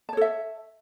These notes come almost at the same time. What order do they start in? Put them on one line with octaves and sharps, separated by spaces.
A5 C#5 A4 E5